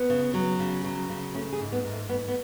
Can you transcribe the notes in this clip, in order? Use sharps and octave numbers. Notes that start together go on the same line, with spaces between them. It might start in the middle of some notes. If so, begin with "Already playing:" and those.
Already playing: B3
C#3
F#3
C#3
F#3
C#3
A3 C#4
G#4
G#2
B3
G#2
A3
G#2 B3
B3